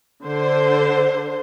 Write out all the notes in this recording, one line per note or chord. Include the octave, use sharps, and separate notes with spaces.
D3 C5